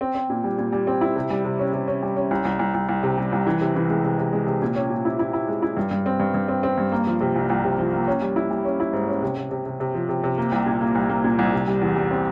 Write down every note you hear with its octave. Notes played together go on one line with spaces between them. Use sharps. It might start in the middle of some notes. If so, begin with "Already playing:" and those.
C4
C4
A#2
G3
A#2
G3
C4
E4
C3
G3
C3
C#4
C3
C#4
G3
C#4
C2
C2
C2
C2
C2
C3
G3
C2
E3
C3
E3
G#3
C3
C3
G#3
C3
A#2
C#4
A#2
E4
E4
E4
G#3
E4
G2
G2
C4
G2
G2
C4
C4
G2
A#3
F3
C3
C2
C2
C3
F3
A#3
C#4
G3
E4
G3
C#4
E4
G#2
C#4
C3
C3
C3
C3
C3
F3
C3
C3
A#3
C2
A#2
A#3
C2
A#3
A#2
C2
C3
G3
E2
G3
C4